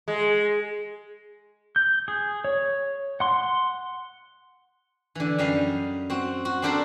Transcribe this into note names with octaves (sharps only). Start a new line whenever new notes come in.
G#3
G6
G#4
C#5
F#5 C6
D3 E3
F#2 G3 D#5 F5
C4 F#4
F#4
C4 D4 G4 A4 A#4 C5